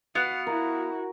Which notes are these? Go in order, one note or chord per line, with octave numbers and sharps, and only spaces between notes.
B3 F#4 F5 F#5 F#6
E4 F#4 A#4